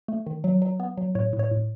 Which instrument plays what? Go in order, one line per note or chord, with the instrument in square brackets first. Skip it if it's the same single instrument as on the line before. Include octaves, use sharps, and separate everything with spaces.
[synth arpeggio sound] A3
D#3
F#3
F#3
B3
F#3
A2 C#5
A2
C#5
A2